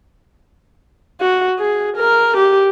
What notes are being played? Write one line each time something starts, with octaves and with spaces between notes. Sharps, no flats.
F#4
G#4
A#4
G4